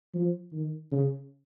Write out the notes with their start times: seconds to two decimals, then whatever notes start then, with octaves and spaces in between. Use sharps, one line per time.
0.14 F3
0.53 D#3
0.92 C#3